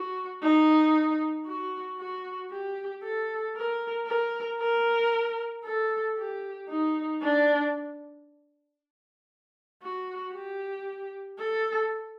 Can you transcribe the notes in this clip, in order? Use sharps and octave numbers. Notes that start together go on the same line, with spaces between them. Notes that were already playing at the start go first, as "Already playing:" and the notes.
Already playing: F#4
D#4
F#4
F#4
G4
A4
A#4
A#4
A#4
A4
G4
D#4
D4
F#4
G4
A4